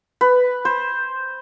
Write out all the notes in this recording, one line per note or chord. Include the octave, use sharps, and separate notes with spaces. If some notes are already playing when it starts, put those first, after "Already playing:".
B4
C5